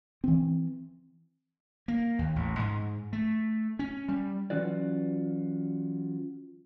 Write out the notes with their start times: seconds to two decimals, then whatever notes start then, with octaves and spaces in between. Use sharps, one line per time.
0.24 E3 C4
1.88 A#3
2.19 D#2
2.36 A1
2.59 G#2
3.13 A3
3.79 C#4
4.08 G3
4.50 E3 F#3 C#4 F4 F#4 D5